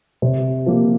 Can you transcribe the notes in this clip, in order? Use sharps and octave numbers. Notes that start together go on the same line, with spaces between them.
C3
F3 A#3 G4